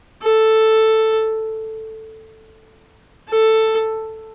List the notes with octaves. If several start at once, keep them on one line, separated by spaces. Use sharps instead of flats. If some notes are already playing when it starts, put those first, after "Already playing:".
A4
A4